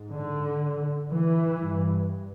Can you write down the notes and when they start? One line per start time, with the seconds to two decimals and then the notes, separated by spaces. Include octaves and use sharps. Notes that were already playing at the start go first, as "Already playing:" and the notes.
Already playing: G#2
0.13 D3
1.10 E3
1.60 G2